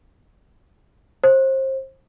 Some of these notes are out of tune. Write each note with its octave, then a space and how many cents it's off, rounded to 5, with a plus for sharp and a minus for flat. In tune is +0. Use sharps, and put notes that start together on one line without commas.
C5 +30